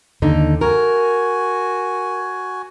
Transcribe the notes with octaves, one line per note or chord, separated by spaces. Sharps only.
D#2 D3 D#4
F#4 A#4 G#5